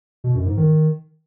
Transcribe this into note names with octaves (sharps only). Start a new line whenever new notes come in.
B2
F#2
G#2
D#3